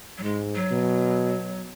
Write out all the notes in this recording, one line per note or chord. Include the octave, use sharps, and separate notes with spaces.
F#3
G#2 G#3
F#3
B2